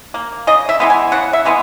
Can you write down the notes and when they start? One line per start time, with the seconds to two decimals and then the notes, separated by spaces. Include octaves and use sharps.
0.14 A#3
0.47 C#3 D#5
0.69 E5
0.80 E3 G#3 B3
0.90 G#5
1.12 C#3 F#5
1.33 E5
1.45 E3 G#3 B3